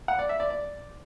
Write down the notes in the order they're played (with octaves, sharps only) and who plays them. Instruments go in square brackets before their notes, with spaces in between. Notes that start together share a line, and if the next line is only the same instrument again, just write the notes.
[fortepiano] F#5
D5
E5
D5
D5